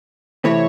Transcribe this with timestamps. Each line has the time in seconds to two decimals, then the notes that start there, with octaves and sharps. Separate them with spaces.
0.44 C3 E3 A3 C4 E4 C#5